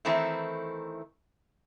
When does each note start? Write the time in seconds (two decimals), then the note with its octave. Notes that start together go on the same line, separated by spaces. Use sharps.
0.05 D#3 E3 A3 C4 D#4 E4